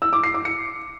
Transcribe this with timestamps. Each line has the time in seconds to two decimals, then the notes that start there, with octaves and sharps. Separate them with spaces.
0.02 E6
0.13 D6
0.23 C7
0.34 D6
0.45 C#7